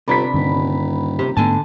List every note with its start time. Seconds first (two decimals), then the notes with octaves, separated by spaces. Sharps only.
0.08 G1 C3 D4 A#5 B5 B6
0.34 D#1 G2 D3
1.19 C3 G4 C5
1.37 G#2 D3 A3 B3 G#5 A5